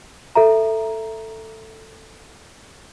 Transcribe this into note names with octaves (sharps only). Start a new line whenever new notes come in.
A4 E5 A#5